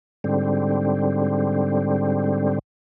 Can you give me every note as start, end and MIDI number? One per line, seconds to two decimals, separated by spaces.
0.24 2.59 44
0.24 2.59 50
0.24 2.59 55
0.24 2.59 60